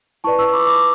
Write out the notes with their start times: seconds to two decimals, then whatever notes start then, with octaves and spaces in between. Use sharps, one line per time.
0.24 E4 B4 D5 A5 C#6
0.38 C#6 E6
0.53 B5 D6
0.67 B5 D6